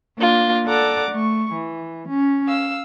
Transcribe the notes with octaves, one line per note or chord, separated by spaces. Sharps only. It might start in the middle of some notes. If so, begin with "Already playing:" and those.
A#3 D4 F4
A4 D5 F#5 A#5 D6
A3 C#6
E3
C#4
F5 E6